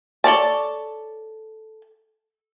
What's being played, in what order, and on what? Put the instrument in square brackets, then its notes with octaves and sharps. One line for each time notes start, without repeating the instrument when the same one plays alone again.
[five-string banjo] A4 C#5 D5 A5